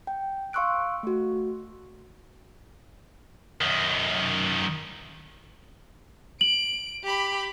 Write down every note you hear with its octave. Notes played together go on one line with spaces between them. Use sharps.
G5
F5 C6 C#6 E6 F#6 D7
A3 F#4
F#2 D#3
D7 F#7
G4 B5